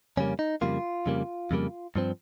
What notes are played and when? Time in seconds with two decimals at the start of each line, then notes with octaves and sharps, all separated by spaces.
0.17 F2 C#3 G3 A#3 C#4
0.39 D#4
0.61 F2 C#3 G3 A#3 F4
1.06 F2 C#3 G3 A#3
1.51 F2 C#3 G3 A#3
1.96 G2 F3 C4